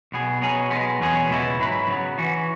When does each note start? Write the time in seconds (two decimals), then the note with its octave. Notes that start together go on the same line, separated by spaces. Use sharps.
0.12 B1 B2 B3 G#4
0.42 B2 F#3 C#4 G#4
0.71 B1 B2 G#3 B3
1.01 E2 B2 F#3 C#4 G#4
1.29 C#2 B2 G#3 B3 E4
1.59 G#2 F#3 E4 B4
1.88 C#3 F#3 B3
2.18 E3 C#4 F#4